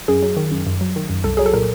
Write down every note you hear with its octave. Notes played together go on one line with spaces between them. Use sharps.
F#2 G#4
F#3
D#3
F#2
F#2
F#3
D#3
F#2
C2 A4
F#3 G#4
A4
A#2 A#4